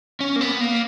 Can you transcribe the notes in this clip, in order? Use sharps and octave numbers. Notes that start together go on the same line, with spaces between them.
C#4
A#3
B3
A#3